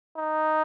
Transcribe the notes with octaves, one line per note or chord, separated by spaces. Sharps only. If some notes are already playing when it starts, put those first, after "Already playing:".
D#4